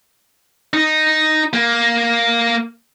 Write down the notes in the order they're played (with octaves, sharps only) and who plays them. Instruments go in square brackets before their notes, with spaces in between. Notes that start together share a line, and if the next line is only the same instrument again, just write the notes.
[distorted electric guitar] D#4
A#3